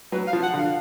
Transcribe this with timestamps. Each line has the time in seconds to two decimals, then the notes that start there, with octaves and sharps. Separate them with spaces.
0.12 F#3 B4
0.27 F5
0.33 F3
0.43 F#5
0.53 D3
0.58 F5